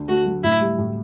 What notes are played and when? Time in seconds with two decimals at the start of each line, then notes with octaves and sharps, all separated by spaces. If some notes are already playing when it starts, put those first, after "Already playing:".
Already playing: D2 D3
0.08 A3 F#4
0.26 F#3
0.43 A2 E4
0.61 G3
0.78 A2